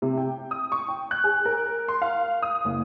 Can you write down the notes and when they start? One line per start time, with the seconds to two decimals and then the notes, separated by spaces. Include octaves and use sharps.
0.02 C3
0.17 G5
0.51 D#6
0.72 C#6
0.88 G5
1.11 F#6
1.24 G#4
1.45 A#4
1.88 C6
2.02 F5
2.42 D#6
2.65 F#1